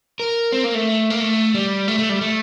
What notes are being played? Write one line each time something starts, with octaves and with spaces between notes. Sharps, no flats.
A#4
C4
A#3
A3
A#3
A3
G3
A3
A3
G3
A3